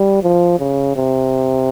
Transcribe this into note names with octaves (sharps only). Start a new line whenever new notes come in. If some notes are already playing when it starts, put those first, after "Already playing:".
Already playing: G3
F3
C#3
C3